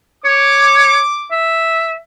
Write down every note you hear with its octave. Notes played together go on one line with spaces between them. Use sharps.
C#5 D6
E5